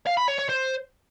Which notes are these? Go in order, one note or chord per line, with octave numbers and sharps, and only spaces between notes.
F5
B5
C#5
C#5
C5